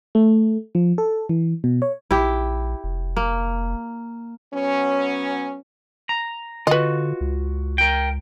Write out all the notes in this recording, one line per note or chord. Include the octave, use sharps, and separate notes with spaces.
A3
F3
A4
E3
B2
C#5
A#1 E4 G4
F1
A#3
F#3 B3 C#4
A#5
D3 F4 F#4 B4 D#5
C#2
A#4 G5